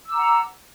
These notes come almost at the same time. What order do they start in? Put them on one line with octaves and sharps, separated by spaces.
E6 D6 A#5 F#5